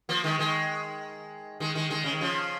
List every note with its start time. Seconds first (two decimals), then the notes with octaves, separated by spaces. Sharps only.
0.09 F3 A#3
0.24 D#3 G#3
0.39 D#3 G#3
1.60 D#3 G#3
1.75 D#3 G#3
1.90 D#3 G#3
2.04 C#3
2.13 D#3
2.21 C#3 F3